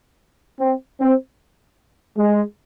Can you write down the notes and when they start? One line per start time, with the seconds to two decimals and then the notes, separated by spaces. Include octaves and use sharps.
0.60 C4
1.00 C4
2.17 G#3